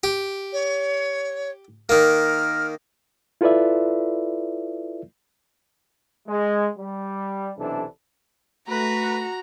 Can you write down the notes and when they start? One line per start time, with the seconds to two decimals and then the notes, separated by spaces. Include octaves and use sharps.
0.04 G4
0.53 C#5
1.89 D#3 A#3 F6
3.41 E4 F4 A4 B4 D5 E5
6.28 G#3
6.78 G3
7.57 B1 C3 E3 D4 A4
8.68 A3 F#4 B4 A#5